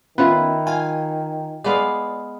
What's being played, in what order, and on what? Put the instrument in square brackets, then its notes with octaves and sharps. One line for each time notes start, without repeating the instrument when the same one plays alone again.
[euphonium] D#3 [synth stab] B3 C#4 F4 [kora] E4 B4
[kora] F4 [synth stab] G#5
[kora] G#3 B3 F5 [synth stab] D5